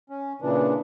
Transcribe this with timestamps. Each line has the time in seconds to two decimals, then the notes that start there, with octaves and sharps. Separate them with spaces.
0.10 C#4
0.42 A#2 C#3 E3 D4